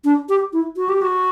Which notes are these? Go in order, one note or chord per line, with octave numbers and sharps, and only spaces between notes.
D4
G4
E4
F#4
G4
F#4